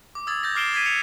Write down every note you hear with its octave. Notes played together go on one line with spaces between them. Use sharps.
D6
D#6 E6 G#6 A6
G6 A6 A#6
D6 F6 C7 D7 E7 G7
G#6 A6 B6 D#7
B6 C#7 F7